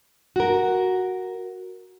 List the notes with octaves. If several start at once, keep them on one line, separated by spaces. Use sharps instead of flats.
F#4 A#4